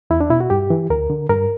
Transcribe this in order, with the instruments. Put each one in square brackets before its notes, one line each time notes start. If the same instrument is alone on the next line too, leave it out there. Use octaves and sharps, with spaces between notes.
[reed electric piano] E2 E4
D4
B2 E4
F#4
G2 G4
E3
D2 A#4
D3
G2 A#4